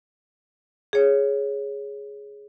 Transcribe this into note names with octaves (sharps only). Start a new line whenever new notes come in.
G#4 C#5